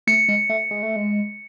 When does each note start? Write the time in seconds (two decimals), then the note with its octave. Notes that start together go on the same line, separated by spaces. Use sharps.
0.07 A3 C#7
0.28 G#3
0.49 A3
0.71 G#3
0.83 A3
0.96 G#3